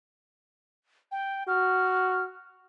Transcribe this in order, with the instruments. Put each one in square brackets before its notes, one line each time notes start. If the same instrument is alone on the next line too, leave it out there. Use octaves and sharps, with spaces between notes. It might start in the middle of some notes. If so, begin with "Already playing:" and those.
[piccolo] G5
[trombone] F#4 [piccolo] F6